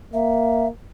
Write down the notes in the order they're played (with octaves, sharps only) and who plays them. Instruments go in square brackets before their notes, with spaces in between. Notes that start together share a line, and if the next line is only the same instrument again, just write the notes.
[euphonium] A#3 [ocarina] E5